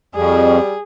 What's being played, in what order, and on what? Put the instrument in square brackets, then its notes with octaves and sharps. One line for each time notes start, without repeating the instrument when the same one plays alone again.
[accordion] F2 [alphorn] G3 [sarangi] G#4